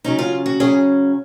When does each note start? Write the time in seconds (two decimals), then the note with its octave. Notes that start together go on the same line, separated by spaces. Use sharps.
0.04 C#3 F#3 C#4 D#4
0.19 F4
0.46 F#4
0.60 C#3 F#3 C#4 G#4